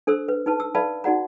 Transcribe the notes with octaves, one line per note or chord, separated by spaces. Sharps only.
D4 A4 C5 E6
B4
D#4 B4 A5
E6
B4 D5 E5 F5 A5 B5
D#4 F#4 D5 F#5 A#5